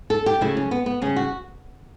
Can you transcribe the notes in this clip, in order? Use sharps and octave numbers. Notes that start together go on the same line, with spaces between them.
A4
G4
C#3 F#3 A3 E4
C#4
B3
B3
C#3 G3 C#4
F#4